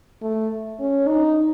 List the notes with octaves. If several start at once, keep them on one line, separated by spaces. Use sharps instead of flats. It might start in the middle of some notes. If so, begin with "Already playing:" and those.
A3
C#4
D#4